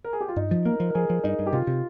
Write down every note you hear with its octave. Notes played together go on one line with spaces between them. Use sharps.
A#4
G#4
G4
F4
G2 D#4
F3
A#3 A#4
F3
A#4
F3 G#4
F3
G2 D#4
G2
G4
C3 F4
C3